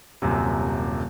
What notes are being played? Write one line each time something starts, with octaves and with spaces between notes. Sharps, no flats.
D#1 F#2 C3